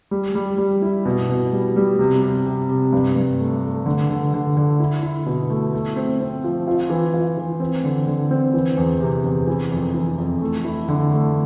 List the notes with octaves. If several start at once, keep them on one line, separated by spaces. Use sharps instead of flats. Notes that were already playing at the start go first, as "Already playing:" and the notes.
G3
G3
G3
E4
B2
B2
G3
G3
C3
C3
C3
C3
G2
G2
A3
A3
D3
D3
D3
D3
E4
E4
B2
A3
A3
C4
C4
F3
F4
E3
F4
E3
C4
D3
D3
C4
E3
E2
C3
E2
E3
F2
E3
F2
A3
E4
D3
A3